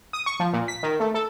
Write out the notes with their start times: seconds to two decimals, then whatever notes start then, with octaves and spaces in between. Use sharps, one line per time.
0.13 D#6
0.26 C#6
0.40 F3
0.53 A#2
0.68 B6
0.83 D#3
1.00 A3
1.14 A4